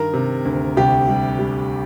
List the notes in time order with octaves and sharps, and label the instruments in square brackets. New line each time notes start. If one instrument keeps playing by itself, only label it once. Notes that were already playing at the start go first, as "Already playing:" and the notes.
Already playing: [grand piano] G2 D#3 A#4
C3
D2
C2 G4
G3
G3